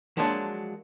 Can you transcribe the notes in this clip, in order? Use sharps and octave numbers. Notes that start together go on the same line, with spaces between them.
F3 F#3 G#3 A#3 D4